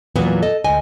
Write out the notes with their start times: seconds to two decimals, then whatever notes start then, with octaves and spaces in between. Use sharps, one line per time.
0.16 E2 A#2 E3 F#3 B3
0.42 A4 D#5
0.64 D2 D#5 G#5